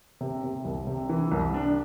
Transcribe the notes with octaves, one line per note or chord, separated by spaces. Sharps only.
C3
C3
C2
C3
E3
C2
D4